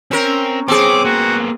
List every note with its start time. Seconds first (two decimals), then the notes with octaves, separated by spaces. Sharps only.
0.11 C4 C#4 A#4
0.68 B3 C4 G#4 C#5 D6
1.05 A#3 B3 F#4